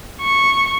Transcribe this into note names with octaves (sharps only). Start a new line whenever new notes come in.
C#6